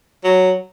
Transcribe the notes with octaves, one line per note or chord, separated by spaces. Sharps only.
F#3